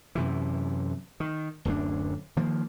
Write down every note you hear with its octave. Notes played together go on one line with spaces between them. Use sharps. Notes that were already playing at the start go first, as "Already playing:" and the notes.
F#2 C3 E3
D#3
D1 F#2 F#3 D4
D#3 F3 A#3